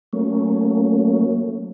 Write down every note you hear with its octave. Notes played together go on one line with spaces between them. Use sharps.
F#3 A3 A#3 C#4